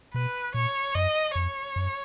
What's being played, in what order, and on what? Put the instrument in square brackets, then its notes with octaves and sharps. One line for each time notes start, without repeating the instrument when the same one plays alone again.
[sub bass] B2 [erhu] B4
[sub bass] A#2 [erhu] C#5
[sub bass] F#2 [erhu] D#5
[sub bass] F2 [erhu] C#5
[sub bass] F#2